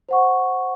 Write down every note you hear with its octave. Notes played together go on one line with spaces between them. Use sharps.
C5 F#5 C#6